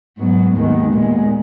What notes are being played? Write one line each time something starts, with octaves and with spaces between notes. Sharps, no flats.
G#2 F#3 B3
D#2 D#3 G#3 B3
A#2 G#3 B3